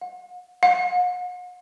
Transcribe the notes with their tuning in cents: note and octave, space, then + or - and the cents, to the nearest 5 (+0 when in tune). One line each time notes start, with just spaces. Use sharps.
F#5 -40
F#5 -45